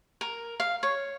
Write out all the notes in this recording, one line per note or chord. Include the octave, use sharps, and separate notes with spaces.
A#4
F5
C#5